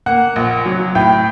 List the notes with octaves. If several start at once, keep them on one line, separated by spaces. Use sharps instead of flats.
A#3 F#5
A#1
F#3
A2 G5